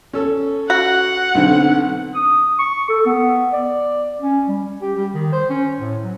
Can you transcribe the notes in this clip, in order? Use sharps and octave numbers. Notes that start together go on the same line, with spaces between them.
C#4 A4
F#4 F#5
B1 D3 C4
D#6
C#6
A4
B3
D5
C#4
G3
G4
G3
D#3
C5
C#4
A2
F#3